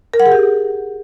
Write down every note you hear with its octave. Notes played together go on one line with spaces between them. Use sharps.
A#4
F#5
G#4
G4